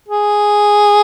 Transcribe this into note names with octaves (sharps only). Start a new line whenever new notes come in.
G#4